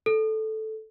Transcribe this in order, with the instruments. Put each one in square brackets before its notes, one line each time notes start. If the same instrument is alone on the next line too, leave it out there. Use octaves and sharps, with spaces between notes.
[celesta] A4